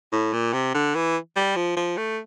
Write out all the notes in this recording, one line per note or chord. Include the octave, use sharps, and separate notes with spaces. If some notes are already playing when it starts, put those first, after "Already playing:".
A2
A#2
C3
D3
E3
G3
F3
F3
A3